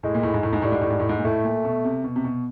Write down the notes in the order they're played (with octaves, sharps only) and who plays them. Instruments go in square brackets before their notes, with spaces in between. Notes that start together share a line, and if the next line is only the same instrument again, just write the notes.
[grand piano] A2 [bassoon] G#3
[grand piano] A#2
A2
G#2
A2
G#2
[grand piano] A2 [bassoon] G3
[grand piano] G#2
A2
G#2
A2
G#2
A#2
[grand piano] A2 [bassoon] A3
[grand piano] A#2
B2
C3
B2
C3
B2